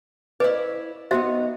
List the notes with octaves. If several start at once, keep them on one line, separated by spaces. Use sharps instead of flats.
E4 B4 C#5 D5
F#3 B3 D#4 F#4 C5 E5